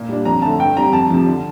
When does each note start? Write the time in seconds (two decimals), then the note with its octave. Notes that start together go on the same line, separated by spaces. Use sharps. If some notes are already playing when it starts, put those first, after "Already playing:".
Already playing: A#2
0.09 G3 D4
0.25 F2 A#5
0.42 D3 A3 A5
0.59 G2 G5
0.76 D3 G3 C4 A#5
0.93 F2 A5
1.10 C3 F3
1.26 D3